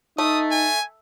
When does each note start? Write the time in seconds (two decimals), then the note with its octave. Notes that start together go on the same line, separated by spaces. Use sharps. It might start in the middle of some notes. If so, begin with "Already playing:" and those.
0.18 A3 D#4 D#6
0.51 G#5